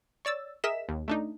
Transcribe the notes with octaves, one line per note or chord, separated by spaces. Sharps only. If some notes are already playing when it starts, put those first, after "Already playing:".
C#5 D5 E6 A6
G#4 A#4 D#5 E5 B6 E7
D#2
A3 D4 D#4